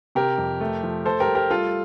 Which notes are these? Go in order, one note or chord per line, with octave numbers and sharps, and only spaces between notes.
C3 G4 A#4
F2
A3
F3
A3 A4 C5
G4 A#4
A3
G4 A#4
G3 F4 A4